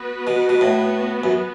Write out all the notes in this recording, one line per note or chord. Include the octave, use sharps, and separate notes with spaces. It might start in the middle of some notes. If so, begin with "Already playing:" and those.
Already playing: B3 F#4 B4
B2
B2
A2
F#2